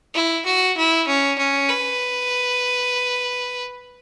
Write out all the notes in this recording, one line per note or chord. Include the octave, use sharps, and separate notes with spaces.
E4
F#4
E4
C#4
C#4
B4